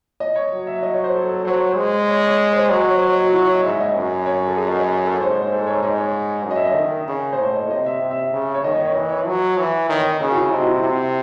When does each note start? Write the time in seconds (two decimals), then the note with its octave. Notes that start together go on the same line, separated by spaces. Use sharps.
0.20 D#5
0.36 C#5
0.52 F#3
0.67 E5
0.83 D#5
0.93 C#5
1.04 C5
1.14 A4
1.30 A4
1.45 F#3 C5
1.58 C#5
1.72 C5
1.77 G#3
2.08 C#5
2.23 C#5
2.53 C5
2.62 C#5
2.70 F#3 D#5
2.84 C#5
2.91 C5
3.02 C#5
3.12 D#5
3.22 F#4
3.33 E4
3.43 C#5
3.54 D#5
3.64 G#2 E5
3.80 D#5
3.96 F#2
4.26 C#5
4.47 A4
4.57 G#4
4.68 D#5
4.79 C#5
5.05 A4
5.21 G#2 C5
5.31 C#5
5.42 C5
5.52 A4
5.67 C#5
5.83 G#2 D#5
5.98 C#5
6.45 F#2
6.51 D#5
6.56 E5
6.66 D#5
6.76 D#3
7.08 C#3
7.33 C5
7.38 A2 C#5
7.55 D#5
7.70 C3 D#5
7.86 E5
8.02 C3
8.11 E5
8.33 C#3
8.54 C#5
8.64 D#3 D#5
8.75 D#5
8.85 C#5
8.95 E3 D#5
9.11 C#5
9.27 F#3
9.58 E3
9.89 D#3 C#5
9.99 D#5
10.20 C#3 G#4
10.31 F#4
10.36 E4
10.51 C3 D#4
10.60 F#4
10.67 E4
10.83 C3 E4